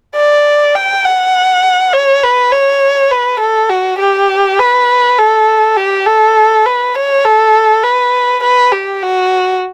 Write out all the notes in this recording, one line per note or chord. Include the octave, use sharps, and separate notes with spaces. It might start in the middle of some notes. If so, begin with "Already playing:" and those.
D5
G5
F#5
C#5
B4
C#5
B4
A4
F#4
G4
B4
A4
G4
A4
B4
C#5
A4
B4
B4
G4
F#4